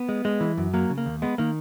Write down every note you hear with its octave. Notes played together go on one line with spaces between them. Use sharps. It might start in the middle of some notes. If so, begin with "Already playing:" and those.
Already playing: B3
G#3
G#3
E3
F#2
F#3 A#3
C#3
A#3
D#2
G#3 B3
D#3 A#3